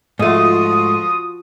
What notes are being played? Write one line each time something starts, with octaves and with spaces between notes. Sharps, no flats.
G#2 F3 A3 F4 F#4 D#6